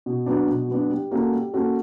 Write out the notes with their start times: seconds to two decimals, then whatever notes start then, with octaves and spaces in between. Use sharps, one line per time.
0.06 B2
0.26 F#3 B3 D4
0.48 B2
0.69 F#3 B3 D4
0.90 G3
1.11 A#3 C#4 F#4 A4
1.32 G3
1.54 A#3 C#4 F#4 A4